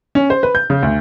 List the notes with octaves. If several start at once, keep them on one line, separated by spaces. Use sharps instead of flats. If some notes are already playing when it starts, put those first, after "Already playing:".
C#4
C5
B4
G6
C#3
D2